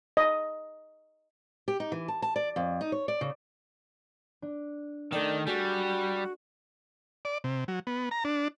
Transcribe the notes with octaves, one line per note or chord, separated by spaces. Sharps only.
D#5
G4
D#4
E3
A5
A5
D5
F2
D#4
C#5
D5
C#3
D4
D#3 A3 D5 G5
G3 F#4 G#4 D5
D5
C3
F#3
B3
A#5
D4